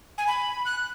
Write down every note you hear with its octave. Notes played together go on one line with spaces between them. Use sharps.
G#5
B5
F#6